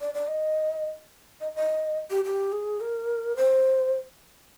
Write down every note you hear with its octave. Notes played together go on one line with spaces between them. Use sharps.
D5
D5
D#5
D#5
D#5
G4
G4
G#4
A#4
C5